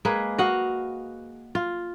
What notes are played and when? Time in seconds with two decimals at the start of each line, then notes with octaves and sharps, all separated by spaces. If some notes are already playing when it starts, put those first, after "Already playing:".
0.05 G#3 A#3 G#4 B4
0.38 F#4 D#5 F5 F#5
1.55 F4